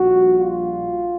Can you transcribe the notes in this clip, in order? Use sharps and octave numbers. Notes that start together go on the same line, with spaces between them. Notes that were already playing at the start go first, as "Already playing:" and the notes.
Already playing: A#1 A#2 G3 F#4
F4